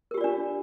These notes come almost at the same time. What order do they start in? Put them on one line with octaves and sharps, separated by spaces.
A#4 G4 F4 D5 D4